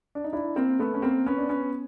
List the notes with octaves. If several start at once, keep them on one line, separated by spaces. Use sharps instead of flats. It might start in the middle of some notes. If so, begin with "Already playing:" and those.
D4
D#4
D4 E4
A#3 C4
A3 B3
C#4
A#3 C4
B3 C#4
D4
B3 C#4